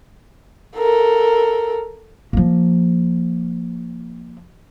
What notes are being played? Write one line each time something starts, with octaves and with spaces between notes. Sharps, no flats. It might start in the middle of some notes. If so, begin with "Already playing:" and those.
A4 A#4
F3 A#3